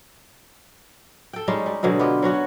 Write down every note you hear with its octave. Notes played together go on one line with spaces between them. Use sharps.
A4 G5
G3 G#3 C#4 D#4
G3
B2 D3 F#3 G#3
B3 F4 G4
F#3 C#4 F#4